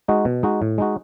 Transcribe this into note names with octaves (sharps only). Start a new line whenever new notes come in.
G#3 D#4 F#4
B2
G#3 D#4 F#4
A2
G#3 D#4 F#4